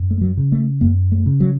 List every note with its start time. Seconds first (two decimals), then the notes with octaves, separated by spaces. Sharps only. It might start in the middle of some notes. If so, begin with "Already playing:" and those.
Already playing: F#2
0.11 A3
0.21 F#3
0.37 C#3
0.52 A3
0.81 F#2 A#3
1.12 A3
1.26 C#3
1.40 F#3